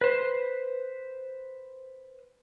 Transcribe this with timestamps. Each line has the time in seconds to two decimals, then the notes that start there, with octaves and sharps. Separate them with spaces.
0.01 B4 C5